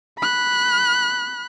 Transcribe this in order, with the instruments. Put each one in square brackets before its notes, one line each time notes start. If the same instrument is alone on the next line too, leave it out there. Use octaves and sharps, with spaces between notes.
[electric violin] B5 F#6